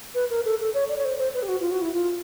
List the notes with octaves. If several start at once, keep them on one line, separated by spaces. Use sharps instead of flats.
B4
A#4
A4
A4
C#5
D5
C#5
C5
C5
B4
G4
F#4
F4
F#4
E4
F4